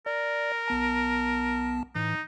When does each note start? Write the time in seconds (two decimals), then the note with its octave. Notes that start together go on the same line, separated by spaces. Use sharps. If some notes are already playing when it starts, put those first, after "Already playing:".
0.06 A#4 D5
0.68 B1 B3 A5
1.95 A2 E3 D#4